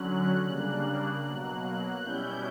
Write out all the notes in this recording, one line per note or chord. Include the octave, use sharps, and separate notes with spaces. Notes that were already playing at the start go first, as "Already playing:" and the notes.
Already playing: D3 F#3 C#4 F#6
C#3 G3 A#3 D4
B2 F#3 A#3
B2 G3 C#4 E4 G6